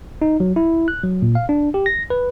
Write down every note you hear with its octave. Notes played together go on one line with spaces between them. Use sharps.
D#4
F#3
E4
F#6
F#3
A#2
F5
D4
G4
A#6
B4